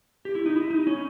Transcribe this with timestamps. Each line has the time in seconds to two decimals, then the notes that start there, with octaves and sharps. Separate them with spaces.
0.25 G4
0.35 E4
0.46 D#4
0.56 E4
0.70 D#4
0.87 C#4